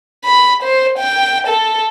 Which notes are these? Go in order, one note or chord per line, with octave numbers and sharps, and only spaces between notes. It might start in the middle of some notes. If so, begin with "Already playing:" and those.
B5
C5
G5
A4